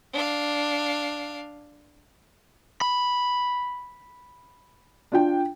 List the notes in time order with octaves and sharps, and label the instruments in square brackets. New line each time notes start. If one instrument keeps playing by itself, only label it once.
[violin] D4 F5
[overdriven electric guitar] B5
[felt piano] D4 F4 G5